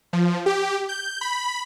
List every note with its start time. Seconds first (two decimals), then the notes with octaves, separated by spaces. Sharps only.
0.13 F3
0.46 G4
0.89 G6
1.21 B5